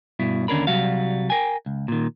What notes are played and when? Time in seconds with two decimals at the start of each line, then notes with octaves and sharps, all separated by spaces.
0.19 G2 B2 E4
0.48 D#2 D3 C#4 D4 A#4 B5
0.67 C2 F#3 G3 F#4 F5
1.30 A#4 G5 G#5
1.66 C#2
1.88 A#2 D#3